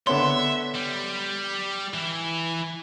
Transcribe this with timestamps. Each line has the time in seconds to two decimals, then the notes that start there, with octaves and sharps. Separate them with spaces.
0.07 D3 B3 C#5 E5 C6
0.75 G3
1.94 E3